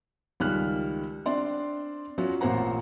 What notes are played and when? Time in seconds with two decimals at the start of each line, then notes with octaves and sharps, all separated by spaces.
0.40 C#2 D#3 G3 F6 F#6
1.26 C4 D4 D5 C6
2.18 F#3 C#4 F4 F#4
2.41 A1 A#2 C4 C5 F#5 A#5